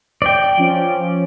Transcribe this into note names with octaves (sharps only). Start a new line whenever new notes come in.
D5 G5
F3 C#4